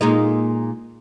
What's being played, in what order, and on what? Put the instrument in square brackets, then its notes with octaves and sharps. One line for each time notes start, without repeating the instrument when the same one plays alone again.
[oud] A#2 G#3 D#4